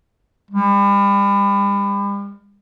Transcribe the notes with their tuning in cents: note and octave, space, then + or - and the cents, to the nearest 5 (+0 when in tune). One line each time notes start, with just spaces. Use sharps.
G3 +40